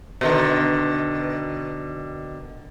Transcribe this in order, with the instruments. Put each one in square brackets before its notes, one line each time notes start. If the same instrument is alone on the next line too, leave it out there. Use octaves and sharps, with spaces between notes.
[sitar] B2 D3 D#3